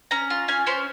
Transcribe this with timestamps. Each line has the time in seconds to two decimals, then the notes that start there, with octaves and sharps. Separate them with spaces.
0.11 C#4 A#5
0.30 F4
0.48 C#4 G#5
0.67 C#4 C5